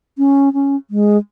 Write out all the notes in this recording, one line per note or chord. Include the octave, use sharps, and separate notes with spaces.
C#4
C#4
G#3